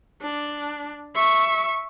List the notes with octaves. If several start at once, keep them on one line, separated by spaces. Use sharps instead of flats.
D4
E5 C#6